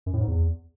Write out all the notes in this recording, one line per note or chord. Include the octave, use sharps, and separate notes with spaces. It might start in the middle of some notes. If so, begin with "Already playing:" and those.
F#2
A2
G#2
E2